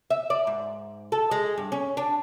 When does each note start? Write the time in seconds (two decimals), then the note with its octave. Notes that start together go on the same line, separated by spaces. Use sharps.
0.10 E5
0.30 D5
0.47 G#2
1.12 A4
1.31 G#3
1.58 G2
1.72 C#4
1.97 D4